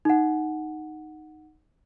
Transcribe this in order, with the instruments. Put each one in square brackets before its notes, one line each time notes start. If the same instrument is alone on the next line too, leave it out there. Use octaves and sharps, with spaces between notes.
[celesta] D#4 F#5